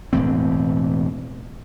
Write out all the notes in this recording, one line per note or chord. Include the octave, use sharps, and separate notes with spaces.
E1 A2 E3 C4